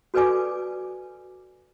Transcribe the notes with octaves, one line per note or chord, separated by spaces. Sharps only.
F#4 A4 B4 D5 G#5 D6